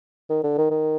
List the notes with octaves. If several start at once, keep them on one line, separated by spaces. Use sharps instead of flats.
D#3
D3
D#3
D#3